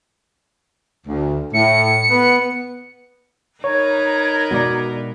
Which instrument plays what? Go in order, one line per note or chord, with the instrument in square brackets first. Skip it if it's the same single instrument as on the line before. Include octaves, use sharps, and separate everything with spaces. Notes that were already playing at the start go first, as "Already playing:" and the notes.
[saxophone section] D2
[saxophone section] A2 [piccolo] C#7
[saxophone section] B3
[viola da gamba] D#4 A#4 B4 [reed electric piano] C#5 [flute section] A#5 G#6
[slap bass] B2 G#3 B3 [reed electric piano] F#4 D5